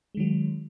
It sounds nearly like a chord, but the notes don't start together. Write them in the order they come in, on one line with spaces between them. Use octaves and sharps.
G#3 D#3 F#3